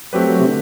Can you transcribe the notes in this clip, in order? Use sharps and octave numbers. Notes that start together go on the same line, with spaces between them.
F#3 A3 C4 G4 B4
F#3
C3
D3